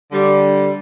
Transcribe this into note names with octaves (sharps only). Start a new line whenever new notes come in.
D3 G3